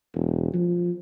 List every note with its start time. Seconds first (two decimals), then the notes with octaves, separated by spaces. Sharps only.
0.14 E1
0.53 F3